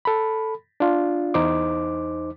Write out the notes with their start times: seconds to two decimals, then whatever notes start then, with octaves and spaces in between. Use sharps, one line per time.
0.05 A4 B5
0.80 D4 F4
1.34 E2 D#4 C5 D6